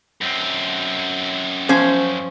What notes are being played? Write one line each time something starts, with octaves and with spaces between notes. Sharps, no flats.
F#2 C4
F3 C#4 C5